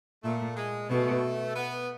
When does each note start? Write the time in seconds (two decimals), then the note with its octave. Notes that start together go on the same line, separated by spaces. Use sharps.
0.24 A#2 A3
0.57 G#3
0.90 B2 A3
1.55 B3